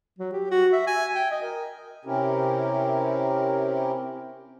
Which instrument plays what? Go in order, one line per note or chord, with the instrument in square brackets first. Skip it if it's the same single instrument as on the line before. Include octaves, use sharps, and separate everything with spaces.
[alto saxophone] F#3
G4
F#4
E5
G#5
G5
D#5
A#4
[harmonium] C3 C4 C#4 E4 G4 A#4